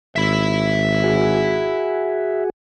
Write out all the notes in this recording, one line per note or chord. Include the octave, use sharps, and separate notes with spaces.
G#1 E5 B5
F#4 G#4